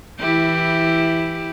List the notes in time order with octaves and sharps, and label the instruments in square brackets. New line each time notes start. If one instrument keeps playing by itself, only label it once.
[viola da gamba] E3 E4 G4